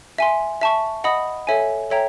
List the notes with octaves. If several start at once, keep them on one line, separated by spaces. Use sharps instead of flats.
E5 G#5 C6
E5 A5 C#6
D#5 F#5 B5 D#6
A4 C#5 E5 G#5
A4 C#5 E5 G5 A#5